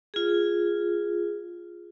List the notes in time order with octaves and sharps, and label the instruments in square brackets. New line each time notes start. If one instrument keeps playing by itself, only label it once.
[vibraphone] F4 G#4